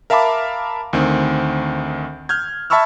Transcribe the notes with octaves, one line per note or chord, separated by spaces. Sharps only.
A#4 E5 F5 A5 B5 D6
D2 D#3 C4
F6 G6 G#6
E5 A5 B5 C#6 E6 F6